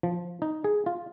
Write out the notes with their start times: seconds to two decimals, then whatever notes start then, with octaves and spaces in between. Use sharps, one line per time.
0.03 F3
0.42 D#4
0.64 G#4
0.86 F4